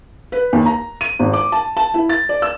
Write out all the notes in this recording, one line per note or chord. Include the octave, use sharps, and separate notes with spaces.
B4
D#2
A#5
D#7
G#1
D6
A5
A5
E4
A6
D5
E6